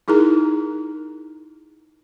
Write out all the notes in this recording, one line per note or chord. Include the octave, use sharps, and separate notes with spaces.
D#4 E4 G#4 A#4 A#5